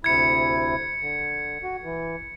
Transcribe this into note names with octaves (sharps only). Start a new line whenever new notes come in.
D2 C3 E4 G#6 C#7
D3
F#4
E3